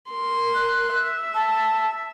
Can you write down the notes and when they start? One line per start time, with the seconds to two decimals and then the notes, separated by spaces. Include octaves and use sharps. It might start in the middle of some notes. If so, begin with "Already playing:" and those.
0.11 A#4 C6
0.54 F#6
0.95 E5
1.34 A5